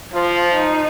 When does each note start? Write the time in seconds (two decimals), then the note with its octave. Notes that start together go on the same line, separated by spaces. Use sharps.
0.13 F3 F4
0.54 D#4